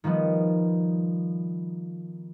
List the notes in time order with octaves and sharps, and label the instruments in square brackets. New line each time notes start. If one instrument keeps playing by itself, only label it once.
[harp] D#3 F3 G3 B3